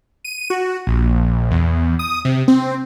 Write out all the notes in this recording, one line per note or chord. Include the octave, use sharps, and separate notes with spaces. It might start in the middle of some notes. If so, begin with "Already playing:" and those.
D#7
F#4
A#1
E2
D#6
C3
C4